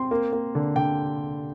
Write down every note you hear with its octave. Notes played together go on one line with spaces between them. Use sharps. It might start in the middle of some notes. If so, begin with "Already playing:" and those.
Already playing: C4 C6
A#3
A#3
D3
D3 G5